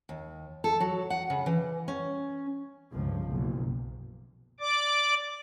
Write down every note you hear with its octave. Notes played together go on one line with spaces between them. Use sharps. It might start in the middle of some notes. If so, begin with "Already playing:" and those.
D#2
A4
F#3
F#5
C#3
E3
C#4
G1 C#2 F3
F#1 B1
D5 D6